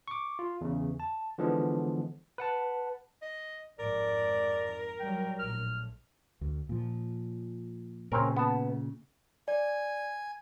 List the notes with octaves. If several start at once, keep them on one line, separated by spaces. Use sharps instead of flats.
C#6 D6
F4
E2 C#3
A5
D3 E3 F3 G#3 B3
B4 F#5 A5
D#5
G#1 F2 G#2 A#4 D5
F#3 G3 G5
A#1 A2 F6
D2
A#2 F3
A#2 C#3 C4 C#4 A#4
B3 A5
D5 G#5